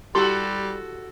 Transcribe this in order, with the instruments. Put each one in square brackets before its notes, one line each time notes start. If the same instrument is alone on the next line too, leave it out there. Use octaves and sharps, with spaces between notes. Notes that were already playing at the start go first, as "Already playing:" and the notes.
[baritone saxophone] G3 [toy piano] E4 G4 C6 [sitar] F#4 A4